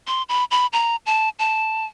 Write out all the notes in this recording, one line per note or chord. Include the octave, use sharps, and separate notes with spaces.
C6
B5
B5
A#5
A5
A5